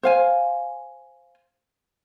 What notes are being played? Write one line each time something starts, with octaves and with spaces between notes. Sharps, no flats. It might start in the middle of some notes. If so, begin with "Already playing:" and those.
C5 F5 G#5